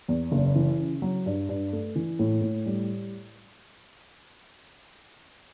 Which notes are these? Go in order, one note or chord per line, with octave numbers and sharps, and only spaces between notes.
E2
F#1
E3
C#3
F#3
G2
G2
A3
E3
A2
A2
G3